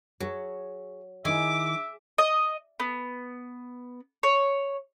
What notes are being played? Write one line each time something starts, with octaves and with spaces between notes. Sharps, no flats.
F#3 G#4 C#5 E5
D#3 E4 G#4 E5 D6
D#5
B3
C#5